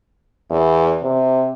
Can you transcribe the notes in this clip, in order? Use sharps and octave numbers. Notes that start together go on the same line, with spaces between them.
E2
C3